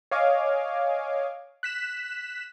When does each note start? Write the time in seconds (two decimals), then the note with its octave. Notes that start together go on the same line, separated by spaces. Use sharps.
0.11 C#5 D#5 F5 G#5 D6
1.63 F#6 B6 E7